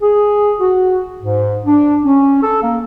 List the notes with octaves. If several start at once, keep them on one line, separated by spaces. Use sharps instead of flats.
G#4
F#4
G#2
D4
C#4
A4
A#3